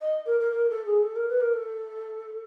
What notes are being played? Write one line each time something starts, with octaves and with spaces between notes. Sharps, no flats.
D#5
A#4
A#4
A#4
A4
G#4
A4
A#4
B4
A#4
A4